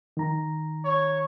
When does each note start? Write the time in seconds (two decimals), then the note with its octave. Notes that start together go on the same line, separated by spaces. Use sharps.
0.17 D#3 A#5
0.84 C#5